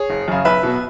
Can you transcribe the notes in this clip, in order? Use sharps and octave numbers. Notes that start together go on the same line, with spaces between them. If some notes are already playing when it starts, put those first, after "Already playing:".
Already playing: G#4 C#5
F#1
F#2 C#3
B1 B4 E5
B2 F#3 B3